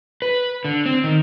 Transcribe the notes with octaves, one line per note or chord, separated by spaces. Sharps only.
B4
D3
C4
D#3